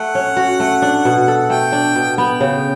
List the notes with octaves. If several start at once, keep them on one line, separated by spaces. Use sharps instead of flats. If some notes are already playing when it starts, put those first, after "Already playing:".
Already playing: A3 F#5
C#4
F#4
A3
D4
B2
A4
A3 G5
D4
B2
B3 G5
C#3